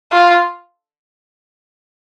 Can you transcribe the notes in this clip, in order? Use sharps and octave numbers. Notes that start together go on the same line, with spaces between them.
F4